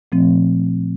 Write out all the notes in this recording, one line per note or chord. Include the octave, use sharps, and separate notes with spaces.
A#2 F3 A3 C4